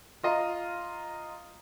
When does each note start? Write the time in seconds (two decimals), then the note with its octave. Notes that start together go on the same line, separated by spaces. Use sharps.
0.23 F4 D#5 F5 A#5